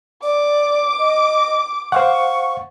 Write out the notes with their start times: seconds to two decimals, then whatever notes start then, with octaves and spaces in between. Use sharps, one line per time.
0.23 D5 D6
0.99 D#5
1.92 C5 F5 F#5 C#6